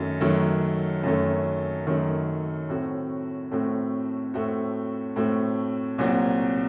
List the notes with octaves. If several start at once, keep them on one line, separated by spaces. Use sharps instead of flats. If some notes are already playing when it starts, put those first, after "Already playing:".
Already playing: F#2 D#3 F#3 A3
F#2 D#3 F#3 A3
F#2 D#3 F#3 A3
F#2 D#3 F#3 A3
A2 A3 C4 F#4
A2 A3 C4 F#4
A2 A3 C4 F#4
A2 A3 C4 F#4
C2 A#2 F#3 C4 F#4